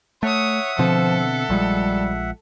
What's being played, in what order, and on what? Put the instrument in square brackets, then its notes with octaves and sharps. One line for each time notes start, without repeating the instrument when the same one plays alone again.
[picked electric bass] A3 [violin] C#5 D#6 [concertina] E5 F#5
[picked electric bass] B2 D3 C4 [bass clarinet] F3 [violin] A4
[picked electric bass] A#1 F3 G#3 [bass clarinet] G3